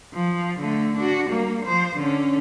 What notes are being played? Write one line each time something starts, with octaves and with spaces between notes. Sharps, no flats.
F3
D3 A3
D4 F#4
G3 A#3
F3 C5
D3 C#4